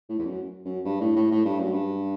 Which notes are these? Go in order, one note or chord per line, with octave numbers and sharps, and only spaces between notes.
A2
E2
F#2
F#2
G2
A2
A2
A2
G2
F#2
G2